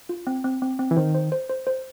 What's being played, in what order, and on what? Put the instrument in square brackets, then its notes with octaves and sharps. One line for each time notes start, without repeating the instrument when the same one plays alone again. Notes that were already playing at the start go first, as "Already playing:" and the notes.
[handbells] F4
C4
C4
C4
C4
[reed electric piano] E3
[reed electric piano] D#3 [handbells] C5
[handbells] C5
C5
C5
C5